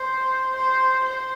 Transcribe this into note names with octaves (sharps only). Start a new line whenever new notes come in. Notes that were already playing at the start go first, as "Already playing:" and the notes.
Already playing: C5
C5
C5